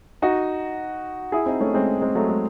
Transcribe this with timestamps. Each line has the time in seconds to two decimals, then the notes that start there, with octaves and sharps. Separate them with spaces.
0.22 D#4 F#4
1.32 E4 G#4
1.46 C4 D#4
1.60 A3 C#4
1.74 G#3 C4
2.01 G#3 C4
2.15 F#3 A3
2.29 G#3